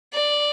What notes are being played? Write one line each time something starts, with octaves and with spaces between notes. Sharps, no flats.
D5